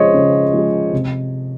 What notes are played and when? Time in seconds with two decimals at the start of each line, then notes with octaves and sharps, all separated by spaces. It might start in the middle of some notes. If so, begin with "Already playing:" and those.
Already playing: C#3 F3 G#3 C5 C#5 D#5
0.14 C#3
0.53 F3 G#3
0.93 C3